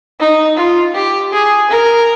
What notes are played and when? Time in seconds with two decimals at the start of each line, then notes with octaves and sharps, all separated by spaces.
0.20 D#4
0.57 F4
0.95 G4
1.33 G#4
1.70 A#4